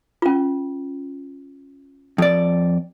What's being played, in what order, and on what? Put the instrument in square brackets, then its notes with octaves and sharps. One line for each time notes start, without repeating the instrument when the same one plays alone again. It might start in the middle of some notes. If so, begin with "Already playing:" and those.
[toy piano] C#4 F4
[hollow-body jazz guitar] F2 D5